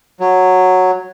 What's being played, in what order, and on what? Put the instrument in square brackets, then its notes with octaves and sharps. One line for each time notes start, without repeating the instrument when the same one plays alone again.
[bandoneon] F#3